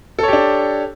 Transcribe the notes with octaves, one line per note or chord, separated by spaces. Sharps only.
D4 G4 A4 C#5